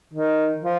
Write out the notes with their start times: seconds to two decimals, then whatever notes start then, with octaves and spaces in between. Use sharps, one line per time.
0.13 D#3
0.63 F3